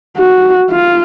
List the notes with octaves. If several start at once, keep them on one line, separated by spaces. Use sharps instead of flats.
F#4
F4